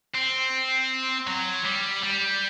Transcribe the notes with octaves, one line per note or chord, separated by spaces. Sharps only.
C4
F#3
G3
G3